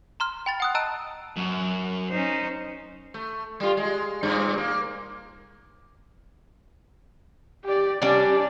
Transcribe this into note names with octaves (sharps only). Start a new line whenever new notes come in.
A#5 C6 F6
G5 B5 A6
F#5 D#6 F#6
D#5 A5 A#5 E6 F#6 D7
F#2
C#4 D#4 C5
A3
G3 F4
G#3
G2 A#2
A#3
G4 D5
G3 C#4 D4 D5